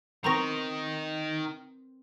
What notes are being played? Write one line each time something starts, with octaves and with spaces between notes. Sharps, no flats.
D#3 C4 D#4 A#4 A#5 C#6 A#6